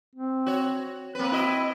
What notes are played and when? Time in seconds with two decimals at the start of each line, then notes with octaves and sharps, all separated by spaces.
0.16 C4
0.46 F#4 C#5
1.15 A#3 C4 B4
1.32 E4 F#4 D#5